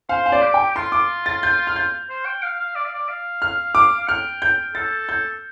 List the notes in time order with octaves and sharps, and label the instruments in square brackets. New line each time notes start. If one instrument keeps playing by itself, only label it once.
[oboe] C5 [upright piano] F5
[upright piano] F5
D5
[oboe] G4
[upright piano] G5
[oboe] G4
[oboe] F4 [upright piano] C6
[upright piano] D6
A6
G6
F6
G6
[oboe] C5
G5
F5
F5
D5
F5
D5
F5
[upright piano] F6
D6
[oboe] F5
[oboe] G5 [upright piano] F6
[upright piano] G6
[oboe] A4 [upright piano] A6
[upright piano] G6